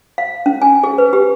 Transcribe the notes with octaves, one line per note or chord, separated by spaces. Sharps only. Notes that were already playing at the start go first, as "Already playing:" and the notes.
F5
C#4
G#5
G#4
B4
G4